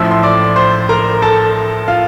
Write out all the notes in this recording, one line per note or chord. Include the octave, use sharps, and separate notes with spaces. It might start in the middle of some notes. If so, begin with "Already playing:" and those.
Already playing: A1 A2 F3 E5 E6
C6
D5 D6
C5 C6
A#4 A#5
A4 A5
F4 F5